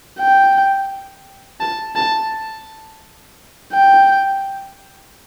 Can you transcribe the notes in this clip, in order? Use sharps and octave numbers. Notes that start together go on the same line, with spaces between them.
G5
A5
A5
G5